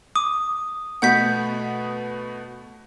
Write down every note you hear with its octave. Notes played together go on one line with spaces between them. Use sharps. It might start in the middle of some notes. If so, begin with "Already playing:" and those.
D6 D#6
B2 A3 B3 F#5 G6 B6